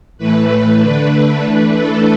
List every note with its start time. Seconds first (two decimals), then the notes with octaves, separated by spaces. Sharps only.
0.18 A2 E3 A3 B4
0.81 D3 A3 D4
1.44 E3 A3 D4 B4
1.76 A4